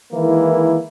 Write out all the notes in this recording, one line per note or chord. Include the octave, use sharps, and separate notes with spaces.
D#3 E3 G#3 A#3 E4